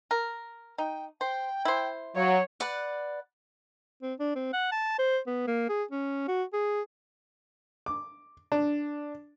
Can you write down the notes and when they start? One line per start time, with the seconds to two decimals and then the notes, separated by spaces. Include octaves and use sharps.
0.11 A#4
0.78 D#4 G5
1.21 C5 G5
1.65 E4 C5
2.16 F#3 C#5 F5
2.60 B4 D5 F#5
4.02 C4
4.20 D4
4.35 C4
4.53 F#5
4.72 A5
4.99 C5
5.27 B3
5.47 A#3
5.69 G#4
5.91 C#4
6.28 F#4
6.53 G#4
7.86 D6
8.52 D4